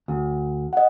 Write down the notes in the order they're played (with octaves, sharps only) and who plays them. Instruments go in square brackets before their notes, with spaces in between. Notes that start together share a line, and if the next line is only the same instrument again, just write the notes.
[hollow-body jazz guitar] D2
[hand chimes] D#5 F#5